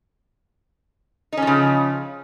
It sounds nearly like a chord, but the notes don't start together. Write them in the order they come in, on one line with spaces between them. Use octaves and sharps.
D#4 C#4 F3 C#3